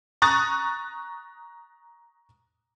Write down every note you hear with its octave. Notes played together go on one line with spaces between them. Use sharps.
A#5 C#6 D#6 F#6 A6